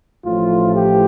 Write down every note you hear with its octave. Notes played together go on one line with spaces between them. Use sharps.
A1 A2 F3 F4
G4